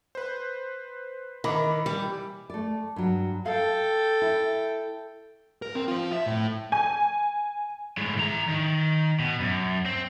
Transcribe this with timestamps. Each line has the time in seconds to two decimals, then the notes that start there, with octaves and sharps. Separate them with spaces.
0.15 B4 C5
1.44 D#3 E3 B5 D6
1.86 G3
2.50 A3 D5
2.96 G2 F#3
3.46 A4 F5 G5
4.22 E4
5.62 A#4
5.75 C4
5.88 F4 C5
6.13 E5
6.26 A2
6.72 G#5
7.97 A2 G#3
8.17 E3 A#5
8.49 D#3
9.19 B2
9.40 F#2
9.86 C4